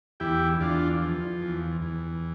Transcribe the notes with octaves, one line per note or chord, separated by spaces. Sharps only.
E2 E4 G4
E2 D4 F4
F3
E2
E2